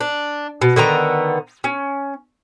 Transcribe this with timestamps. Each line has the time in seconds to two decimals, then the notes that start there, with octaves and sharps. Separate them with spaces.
0.01 D4
0.62 B2
0.76 D3 D#3 B3 A#5
1.64 C#4